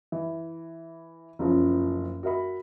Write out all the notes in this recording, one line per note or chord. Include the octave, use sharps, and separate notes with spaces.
E3
F#1 F2 C#3 F3
F#4 A#4 E5 B5